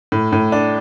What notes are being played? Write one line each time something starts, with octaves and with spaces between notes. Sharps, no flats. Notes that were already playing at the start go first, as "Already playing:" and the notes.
A2
A2
D4